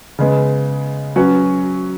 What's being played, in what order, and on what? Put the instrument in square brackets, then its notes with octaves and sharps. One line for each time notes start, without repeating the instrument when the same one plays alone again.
[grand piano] C#3 G#3 B3
F#3 C#4 F#4 B4